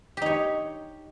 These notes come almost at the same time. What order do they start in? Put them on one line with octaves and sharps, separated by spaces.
G4 D#4 C#5